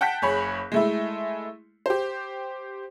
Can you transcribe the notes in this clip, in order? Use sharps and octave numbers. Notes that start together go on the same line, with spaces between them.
F#5 G5 A5 F#6 G6 B6
F#1 G#4 C#5 B5
G#3 A3 E4
G4 C5